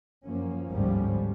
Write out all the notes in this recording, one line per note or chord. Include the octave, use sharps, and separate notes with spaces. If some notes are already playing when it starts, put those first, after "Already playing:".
F#2 F3 A#3 C#4
G1 D2 G#2 F3 G3 C#4